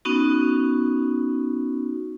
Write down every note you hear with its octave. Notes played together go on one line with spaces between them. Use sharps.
B3 C#4 D#4 F#4